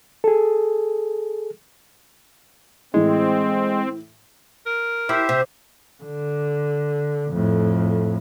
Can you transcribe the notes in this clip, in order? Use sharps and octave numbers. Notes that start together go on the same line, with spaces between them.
G#4 A4
A2 E3 G#3 C4
A#4
E4 G4 C5 E5
C3
D3
F2 A2